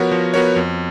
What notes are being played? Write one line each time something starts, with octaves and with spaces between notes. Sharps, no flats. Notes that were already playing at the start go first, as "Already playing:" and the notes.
Already playing: F3 B3 F#4 A#4 C#5
F3
B3 F#4 A#4 C#5
F2